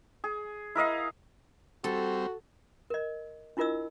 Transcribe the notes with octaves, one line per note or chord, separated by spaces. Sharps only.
G#4
E4 A#4 D#5 F5
G3 C4 F#4 A4
A#4 D#5
D4 E4 F4 A#4 D#5 E6